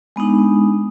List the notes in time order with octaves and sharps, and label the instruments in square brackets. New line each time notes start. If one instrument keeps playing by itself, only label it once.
[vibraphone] G#3 B3 D4 D#4